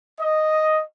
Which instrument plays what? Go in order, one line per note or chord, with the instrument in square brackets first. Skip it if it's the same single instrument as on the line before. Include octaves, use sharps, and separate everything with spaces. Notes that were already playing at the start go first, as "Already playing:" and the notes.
[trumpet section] D#5